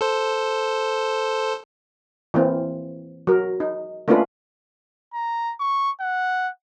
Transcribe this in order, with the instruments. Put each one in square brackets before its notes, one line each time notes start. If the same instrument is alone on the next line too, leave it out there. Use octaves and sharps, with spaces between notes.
[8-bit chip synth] A4 C5
[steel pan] E3 A#3 C4
F#3 A#4
D#4
A3 A#3 C#4 D4 F4 B4
[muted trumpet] A#5
C#6
F#5